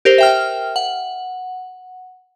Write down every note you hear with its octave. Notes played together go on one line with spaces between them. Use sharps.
G4 A#4 C5
E5 G5 F6
F#5